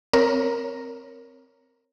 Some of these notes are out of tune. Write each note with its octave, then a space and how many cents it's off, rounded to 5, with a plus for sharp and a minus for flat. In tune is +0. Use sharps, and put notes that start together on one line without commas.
C4 +0 A#4 +0 C#5 +0